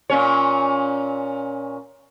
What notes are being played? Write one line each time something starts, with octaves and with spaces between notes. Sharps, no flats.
A#2 C#4 C#5